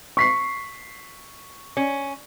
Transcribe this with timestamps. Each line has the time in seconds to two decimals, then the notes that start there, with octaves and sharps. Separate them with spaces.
0.17 C#6 B6 C7
1.77 C#4